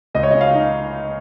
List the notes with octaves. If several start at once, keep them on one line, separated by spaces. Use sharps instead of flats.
C#2 D#5
C#5
D#5
C#3
F5
D#4